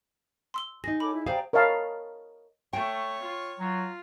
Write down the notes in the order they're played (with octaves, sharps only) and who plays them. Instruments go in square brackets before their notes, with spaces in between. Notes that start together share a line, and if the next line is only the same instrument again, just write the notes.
[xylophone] C6 E6 G7
[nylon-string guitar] D#4 G#4 [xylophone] A#6
[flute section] A4 C#5 D6 [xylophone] B5
[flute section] E4
[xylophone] G4 C5 [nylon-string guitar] G#4 F5 [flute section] D5 G5 A#5
[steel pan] A#4 C#5 D#5 F5 A5 B5
[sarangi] A3 [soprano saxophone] C#5 [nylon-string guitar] G5
[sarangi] F4
[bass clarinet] F#3 [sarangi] F4